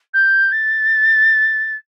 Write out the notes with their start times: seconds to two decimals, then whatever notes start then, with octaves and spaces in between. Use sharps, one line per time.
0.13 G6
0.52 A6